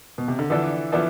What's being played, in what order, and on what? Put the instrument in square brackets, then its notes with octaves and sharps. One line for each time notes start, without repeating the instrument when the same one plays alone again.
[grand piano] B2
C3
D3
[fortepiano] D3 F3 B3 D4 A4 [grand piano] E3
[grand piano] E3 [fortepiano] F3 B3 D4 A4